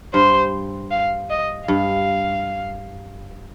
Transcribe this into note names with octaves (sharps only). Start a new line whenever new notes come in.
G2 C5
F5
D#5
G2 F5